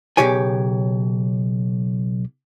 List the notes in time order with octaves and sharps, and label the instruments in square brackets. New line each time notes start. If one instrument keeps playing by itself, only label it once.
[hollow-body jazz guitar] B1 C#3 G4 C#5 G#5